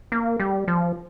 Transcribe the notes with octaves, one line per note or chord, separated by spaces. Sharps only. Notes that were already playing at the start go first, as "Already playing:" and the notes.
A#3
G3
F3